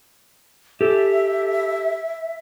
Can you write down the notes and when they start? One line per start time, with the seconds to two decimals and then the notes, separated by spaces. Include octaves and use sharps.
0.81 G4 A4 E5